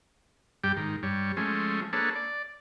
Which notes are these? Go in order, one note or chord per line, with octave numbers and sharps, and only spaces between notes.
G2 G3 G4 G5
G#2 D#3
G2 G3 C#5
F3 G#3 A3 C#4
A#3 D4 G#4 A4 B4 C#5
D5